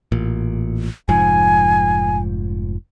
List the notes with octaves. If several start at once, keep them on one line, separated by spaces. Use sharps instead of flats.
A1 A#2
F1 G#2 F3 G#5